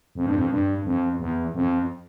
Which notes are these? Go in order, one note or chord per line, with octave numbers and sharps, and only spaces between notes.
F2
G2
F2
G2
F2
E2
F2